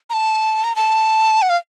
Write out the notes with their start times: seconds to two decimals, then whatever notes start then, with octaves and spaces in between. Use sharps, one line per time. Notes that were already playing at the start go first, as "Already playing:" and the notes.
0.10 A#5
0.13 A5
0.64 A#5
0.76 A5
1.42 F#5
1.49 F5